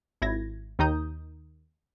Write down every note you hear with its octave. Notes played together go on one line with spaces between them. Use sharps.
G#1 E4 G#6 A#6
D#2 D#3 D#4 A#5 D#6 G6